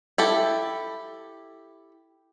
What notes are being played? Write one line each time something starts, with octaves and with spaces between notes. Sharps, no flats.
E4 G4 A4